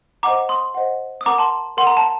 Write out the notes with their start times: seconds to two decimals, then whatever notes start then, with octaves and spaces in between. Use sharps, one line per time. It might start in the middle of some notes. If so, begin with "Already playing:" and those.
0.23 C5 D#5 F#5 A#5 D6
0.49 C6 D#6
0.75 C5 D#5 F#5
1.21 D#6
1.26 A#4 F#5 A#5 D6
1.38 A5 C6
1.77 A#4 F#5 C6
1.87 A#5
1.97 A5